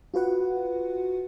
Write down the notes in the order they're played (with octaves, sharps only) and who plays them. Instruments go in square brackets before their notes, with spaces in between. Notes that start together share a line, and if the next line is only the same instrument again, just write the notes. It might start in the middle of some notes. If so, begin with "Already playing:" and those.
[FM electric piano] F4 F#4 B4 F#5